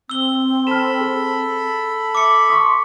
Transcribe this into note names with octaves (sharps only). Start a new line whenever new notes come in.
C4 E6 G7
A4 B5 F6 E7
G#4
E5 D6 C#7
C6 C#6 D#6 B6